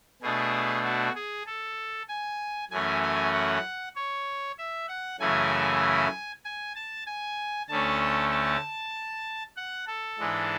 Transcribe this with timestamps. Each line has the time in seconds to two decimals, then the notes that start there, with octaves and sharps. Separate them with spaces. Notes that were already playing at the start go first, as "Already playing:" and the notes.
0.22 B2 A3 D4 G#4
0.84 F#4
1.15 G#4
1.46 A4
2.08 G#5
2.71 F#2 E3 A3 C#4 G#5
3.02 G#5
3.33 F#5
3.96 C#5
4.58 E5
4.88 F#5
5.20 F#2 C#3 E3 A3 E4 G#5
6.45 G#5
6.76 A5
7.06 G#5
7.69 D2 D3 A3 C#4 A5
8.31 A5
9.57 F#5
9.87 A4
10.19 G#2 E3 G#3 D4